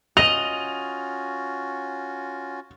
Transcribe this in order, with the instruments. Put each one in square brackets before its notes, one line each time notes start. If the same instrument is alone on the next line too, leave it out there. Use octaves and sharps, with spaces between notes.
[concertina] C#4 F4 F#4 [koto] D#5 [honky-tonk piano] F7